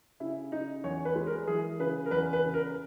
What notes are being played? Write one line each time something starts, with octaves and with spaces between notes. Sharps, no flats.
C#3 E4
C#3 D#4
E2 C#5
B4
G#3
A#4
E3 G#4
C#3 B4
A#4
E2 B4
B4
C#3
A#4